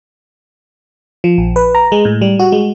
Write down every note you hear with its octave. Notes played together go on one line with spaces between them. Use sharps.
F3
A#1
B4
A#5
G#3
A2
G3
F#4
G#3